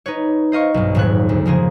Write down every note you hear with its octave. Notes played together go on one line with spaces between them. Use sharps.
D#4 B4 C#5
C5 D#5 F5 C#6
B1 G2
D#1 F2 G#2 C#5 F#6
D2
C#3 F3 A#3 G#4